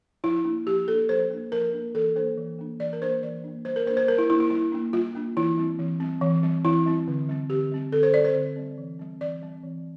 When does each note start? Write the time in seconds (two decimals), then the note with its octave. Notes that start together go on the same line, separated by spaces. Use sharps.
0.24 F3 E4
0.45 A#3 D4
0.66 F3 G4
0.88 A#3 D4 A4
1.09 F3 C5
1.30 A#3 D4
1.52 F3 A#4
1.73 A#3 D4
1.94 E3 A4
2.16 A#3 D4 C5
2.37 E3
2.59 A#3 D4
2.80 E3 D5
2.93 A#4
3.01 A#3 D4 C5
3.23 E3 D5
3.44 A#3 D4
3.65 G3 C5
3.76 A#4
3.86 A#3 C5
3.90 D4
3.97 C5
4.08 G3 A#4
4.18 E4
4.29 A#3 D4 E4
4.40 E4
4.50 G3 E4
4.72 A#3 D4
4.93 G3 F4
5.15 A#3 D4
5.37 E3 E4
5.57 G3 C4
5.79 E3
6.00 G3 C4
6.21 E3
6.43 G3 C4
6.65 E3 E4
6.86 G3 C4
7.08 D3
7.29 G3 C4
7.50 D3 G4
7.72 G3 C4
7.92 D3 A4
8.03 C5
8.14 G3 C4 D5
8.25 C5
8.35 D3
8.56 G3 C4
8.78 E3
9.00 G3 C4
9.21 E3 D5
9.42 G3 C4
9.63 E3